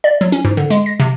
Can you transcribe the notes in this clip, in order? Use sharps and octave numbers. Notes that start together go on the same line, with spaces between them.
D5
F#3
C#4
G#2
D3
G#3
A#6
C3